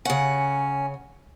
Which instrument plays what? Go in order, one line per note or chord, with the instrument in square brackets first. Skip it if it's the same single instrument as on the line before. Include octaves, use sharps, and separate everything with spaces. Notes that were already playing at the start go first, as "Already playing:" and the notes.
[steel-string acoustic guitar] C#3 F#5 [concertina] C#4